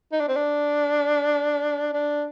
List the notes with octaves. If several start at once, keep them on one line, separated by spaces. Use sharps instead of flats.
D#4
D4
C4
D4
D4